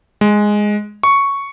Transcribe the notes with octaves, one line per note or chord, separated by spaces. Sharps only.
G#3
C#6